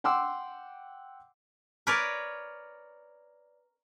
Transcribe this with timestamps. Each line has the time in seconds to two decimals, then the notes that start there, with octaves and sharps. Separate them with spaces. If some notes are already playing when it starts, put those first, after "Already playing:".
0.04 F#5 G5 C6 D6 E6
1.87 A#4 B4 C#5 D5